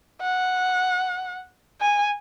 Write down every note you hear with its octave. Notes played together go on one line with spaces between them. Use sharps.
F#5
G#5